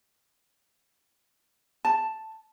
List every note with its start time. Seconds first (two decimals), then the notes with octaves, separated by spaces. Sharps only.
1.85 A5